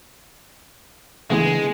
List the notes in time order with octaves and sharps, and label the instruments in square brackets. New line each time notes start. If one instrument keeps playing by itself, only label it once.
[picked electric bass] C#3 E3 D4 [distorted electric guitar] G#3 [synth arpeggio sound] A3 B3 E4 [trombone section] G#4